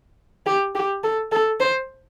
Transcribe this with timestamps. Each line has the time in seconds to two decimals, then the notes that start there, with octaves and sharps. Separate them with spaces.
0.46 G4
0.75 G4
1.04 A4
1.32 A4
1.60 C5